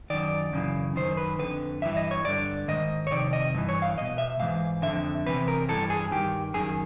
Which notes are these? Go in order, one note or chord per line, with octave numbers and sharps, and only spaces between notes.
F#2 D#3 D5
F#2 C#3 E3
F#2 D#3 C5
B4
F2 D3 B4
G2 E3 E5
D#5
C#5
G2 D3 D5
G#2 D#3 D#5
C#5
F2 C3 D#3 D5
D#5
G2 E3
C#5
F5
E2 B2 D#5
E5
G#2 E3 F5
F2 D3 E5
E2 C3 E3 B4
A#4
G2 E3 A4
G#4
G2 D#3 G4
F#2 D#3 G#4